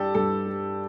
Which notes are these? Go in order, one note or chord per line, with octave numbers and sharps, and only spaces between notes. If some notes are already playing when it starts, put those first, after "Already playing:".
Already playing: G2 G3 G4 A4 D5
G2 A4
G3